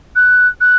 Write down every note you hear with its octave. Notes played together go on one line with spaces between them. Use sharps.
F#6
F#6